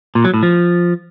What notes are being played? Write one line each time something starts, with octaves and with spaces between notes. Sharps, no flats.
A#2
F#3
A2
F3